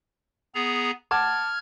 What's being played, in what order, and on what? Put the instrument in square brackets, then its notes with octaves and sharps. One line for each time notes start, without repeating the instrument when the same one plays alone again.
[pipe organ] B3 G#4 A#5
[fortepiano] F#5 A5 D6 [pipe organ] F6 G#6